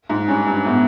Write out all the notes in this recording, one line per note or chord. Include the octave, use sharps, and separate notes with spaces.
G#2
G2 C#4
G2
A2 B3